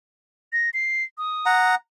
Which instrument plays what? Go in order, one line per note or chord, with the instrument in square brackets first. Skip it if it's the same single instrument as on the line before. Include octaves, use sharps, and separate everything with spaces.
[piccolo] A#6
C7
D#6
[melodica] F#5 A#5